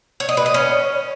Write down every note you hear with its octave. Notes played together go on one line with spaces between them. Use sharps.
C#5
D#5
B4
D#5
C#4